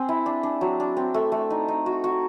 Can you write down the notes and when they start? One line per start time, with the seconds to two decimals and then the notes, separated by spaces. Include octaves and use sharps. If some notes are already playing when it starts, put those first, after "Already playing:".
Already playing: C4 G#4
0.09 E4
0.26 D4
0.43 D4
0.61 F#3
0.80 D4
0.97 C4
1.14 A3
1.32 A3
1.50 D#4
1.68 D#4
1.86 F#4
2.04 F#4